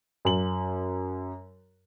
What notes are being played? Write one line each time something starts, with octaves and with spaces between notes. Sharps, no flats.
F#2 F#7